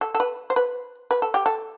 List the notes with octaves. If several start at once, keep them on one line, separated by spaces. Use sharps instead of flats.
A4
A4
B4
C5
B4
B4
A4
G4
A4